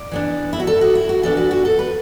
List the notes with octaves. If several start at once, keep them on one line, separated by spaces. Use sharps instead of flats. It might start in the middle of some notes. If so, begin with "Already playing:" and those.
Already playing: D5
E3 B3 D4
E4
F#4
A4
F#4
E4
F#4
E3 B3 D4 A4
F#4
F#4
A4
B4